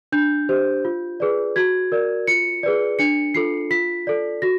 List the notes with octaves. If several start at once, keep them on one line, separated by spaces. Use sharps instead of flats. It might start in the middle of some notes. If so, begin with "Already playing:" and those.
D4 G6
G4 C5
F4
G#4 B4 D5
F#4 G#6
A#4 D5
F4 C#7
G#4 B4 D5
D4 C#7
F4 A4 C7
F4 B6
A4 D5
F#4 A#6